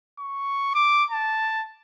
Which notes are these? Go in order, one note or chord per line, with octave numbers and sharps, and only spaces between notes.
C#6
D6
A5